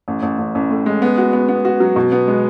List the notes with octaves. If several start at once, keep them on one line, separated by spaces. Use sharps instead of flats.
A1
A1
A1
A1
A2
G#3
B3
F#4
B3
B3
F#4
F#3
B2
B3
G#3